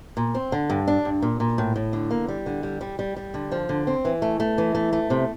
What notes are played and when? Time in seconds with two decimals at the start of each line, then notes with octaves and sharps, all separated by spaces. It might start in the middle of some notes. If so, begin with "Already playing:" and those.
0.17 A#2
0.35 C4
0.52 D3
0.70 G2
0.88 D4
1.05 G2
1.22 A#2
1.40 A#2
1.58 A2
1.76 A2
1.93 D3
2.11 A#3
2.28 G3
2.46 D3
2.63 G3
2.81 G3
2.99 G3
3.16 G3
3.34 D3
3.52 F3
3.69 D3
3.87 C4
4.05 E3
4.22 A3
4.40 A3
4.58 E3
4.75 A3
4.93 A3
5.10 C3